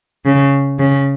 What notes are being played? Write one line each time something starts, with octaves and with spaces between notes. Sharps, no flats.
C#3
C#3